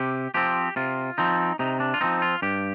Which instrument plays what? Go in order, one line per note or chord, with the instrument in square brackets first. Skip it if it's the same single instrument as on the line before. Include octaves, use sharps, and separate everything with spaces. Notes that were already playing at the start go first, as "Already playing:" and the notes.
Already playing: [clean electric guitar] C3 G4
F3 C4 G4
C3 F4
F3 C4 D#4
C3 D#4
D4
F4
F3 C4 D#4
F4
G2 G4